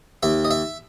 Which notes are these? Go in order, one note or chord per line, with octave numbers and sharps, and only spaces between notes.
D#2 E5
D#5
E5